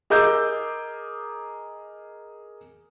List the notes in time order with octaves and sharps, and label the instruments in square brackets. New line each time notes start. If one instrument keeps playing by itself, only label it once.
[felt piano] G#4 A#4 D#5 D6 E6 G6